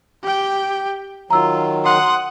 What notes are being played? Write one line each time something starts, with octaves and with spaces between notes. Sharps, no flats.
G4 G5
D#3 F#3 F4 A#5 E6
F#5 C6 D#6